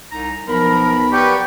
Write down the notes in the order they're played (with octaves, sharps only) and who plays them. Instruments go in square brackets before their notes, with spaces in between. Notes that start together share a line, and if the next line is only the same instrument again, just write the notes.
[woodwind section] C2 D#4 A#5
[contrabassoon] B1 [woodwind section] F3 A#4 [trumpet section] B5
[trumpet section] B3 A#4 B4 [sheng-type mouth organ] G4 [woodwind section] D5 C#6